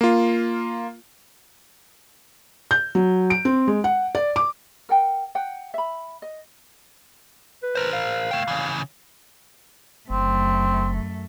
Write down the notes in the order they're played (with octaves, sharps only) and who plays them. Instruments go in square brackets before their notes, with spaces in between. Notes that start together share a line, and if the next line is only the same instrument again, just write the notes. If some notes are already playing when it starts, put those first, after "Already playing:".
[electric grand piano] A#3 F4
[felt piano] G6
F#3
D7
C4
G#3
F#5
D5
D6
[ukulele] A#4 F#5 G5
F#5 G5
E5 B5
D#5
[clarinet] B4
[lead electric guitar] A#4 C5
[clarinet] F5
[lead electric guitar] A3 G5
C#3 E3
[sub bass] F#1 [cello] F#2 A3 [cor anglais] C4